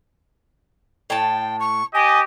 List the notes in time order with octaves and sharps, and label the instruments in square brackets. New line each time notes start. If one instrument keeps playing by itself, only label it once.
[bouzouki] A2 A5 [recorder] G5
[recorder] C#6
[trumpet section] G4 D#5 [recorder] G#5